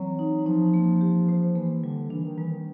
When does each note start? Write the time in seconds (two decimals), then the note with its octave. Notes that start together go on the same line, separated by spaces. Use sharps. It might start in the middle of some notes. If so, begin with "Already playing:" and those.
Already playing: E3 F#3 C4
0.19 D#4
0.46 F3 D#4
0.74 A#3
1.01 G4
1.28 C5
1.56 E3 A#3
1.83 D3 G3
2.10 E3 D4
2.25 D#3
2.38 E3 G3
2.51 D#3